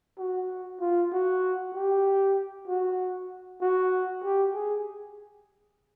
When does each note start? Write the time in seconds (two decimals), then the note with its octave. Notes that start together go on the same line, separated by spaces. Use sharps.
0.19 F#4
0.80 F4
1.12 F#4
1.74 G4
2.67 F#4
3.61 F#4
4.23 G4
4.54 G#4